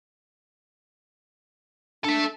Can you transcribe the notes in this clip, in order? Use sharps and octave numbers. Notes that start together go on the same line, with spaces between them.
D4 A4 E5